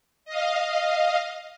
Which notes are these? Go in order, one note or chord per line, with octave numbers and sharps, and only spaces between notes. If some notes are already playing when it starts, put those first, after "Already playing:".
D#5 F5